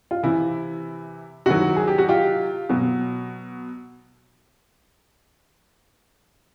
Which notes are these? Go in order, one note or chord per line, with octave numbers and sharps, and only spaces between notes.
F4
C3 E3 E4
C3 D#3 F#3 E4 F#4
G#4
G4
F#4
F4 G4
B2 F#3